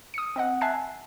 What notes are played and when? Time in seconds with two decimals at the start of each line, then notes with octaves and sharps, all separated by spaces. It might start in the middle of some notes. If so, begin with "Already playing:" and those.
0.14 D#6 C#7
0.36 C4 D#5 F#5
0.61 E5 G#5 A5 F#6 A6 C7